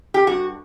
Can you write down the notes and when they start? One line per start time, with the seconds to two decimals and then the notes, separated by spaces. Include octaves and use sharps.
0.14 G4
0.27 G2 F#4